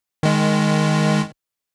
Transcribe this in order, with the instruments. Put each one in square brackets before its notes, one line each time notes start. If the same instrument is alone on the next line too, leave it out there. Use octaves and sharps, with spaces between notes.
[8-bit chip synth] D#3 G#3